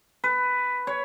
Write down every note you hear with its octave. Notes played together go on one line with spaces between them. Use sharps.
B4
C#5